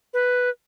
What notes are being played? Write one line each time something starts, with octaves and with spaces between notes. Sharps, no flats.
B4